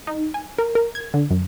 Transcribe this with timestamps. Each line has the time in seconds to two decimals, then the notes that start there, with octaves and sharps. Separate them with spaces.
0.07 D#4
0.34 G#5
0.58 A#4
0.75 A#4
0.95 G#6
1.14 D3
1.30 F#2